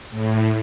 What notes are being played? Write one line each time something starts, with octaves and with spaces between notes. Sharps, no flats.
A2